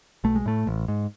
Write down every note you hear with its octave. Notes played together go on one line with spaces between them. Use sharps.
B1 A3
G#3
A2 A3
A1
G#2